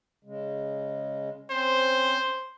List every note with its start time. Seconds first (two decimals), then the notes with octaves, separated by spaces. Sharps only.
0.25 C#3 G#3
1.50 C4 C#4 C5